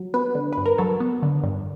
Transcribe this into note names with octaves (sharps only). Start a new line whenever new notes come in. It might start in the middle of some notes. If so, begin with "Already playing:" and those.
Already playing: F#3
B3 B4
D3
G2 B4
A#4
F#3 A4
B3
D3
G2